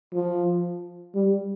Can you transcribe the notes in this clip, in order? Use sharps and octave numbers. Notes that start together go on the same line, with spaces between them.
F3
G3